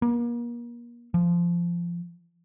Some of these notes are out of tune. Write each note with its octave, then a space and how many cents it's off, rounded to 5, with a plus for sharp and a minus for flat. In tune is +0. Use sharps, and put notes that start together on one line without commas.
A#3 +35
F3 -20